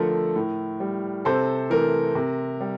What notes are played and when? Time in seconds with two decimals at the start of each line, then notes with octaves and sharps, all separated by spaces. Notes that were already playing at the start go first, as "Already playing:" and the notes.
Already playing: D3 F3 A3 A4 A#4
0.36 A2
0.80 G3
1.25 C3 A4 C5
1.70 E3 A3 A#4
2.15 C3
2.61 G3